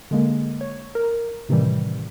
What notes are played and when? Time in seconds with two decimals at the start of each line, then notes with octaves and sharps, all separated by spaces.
0.11 D3 G#3 A#3
0.61 C#5
0.95 A#4
1.49 A2 C3 D#3 E3 G3